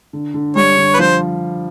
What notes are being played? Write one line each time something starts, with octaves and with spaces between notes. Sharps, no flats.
D3
D3
G3 C#5
D3
B4
F3 C5